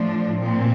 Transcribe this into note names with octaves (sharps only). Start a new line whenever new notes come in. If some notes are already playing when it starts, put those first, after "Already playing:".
Already playing: A2 F3 D4
A#2 C4